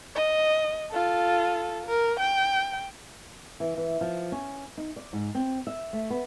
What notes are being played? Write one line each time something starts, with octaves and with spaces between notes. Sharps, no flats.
D#5
F4 A4
A#4
G5
E3
E3
F3
C#4
D#4
D5
G#2
C4
E5
A3
B3